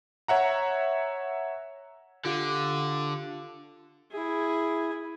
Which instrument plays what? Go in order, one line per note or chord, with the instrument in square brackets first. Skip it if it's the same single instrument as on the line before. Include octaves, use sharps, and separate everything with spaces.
[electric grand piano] C#5 E5 F#5 A#5
[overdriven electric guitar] D3 [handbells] F4 G4 F5
[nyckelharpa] E4 G#4